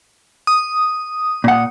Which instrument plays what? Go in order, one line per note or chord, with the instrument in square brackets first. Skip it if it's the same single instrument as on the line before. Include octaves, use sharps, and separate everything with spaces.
[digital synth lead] D#6
[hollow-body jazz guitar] A#2 F#5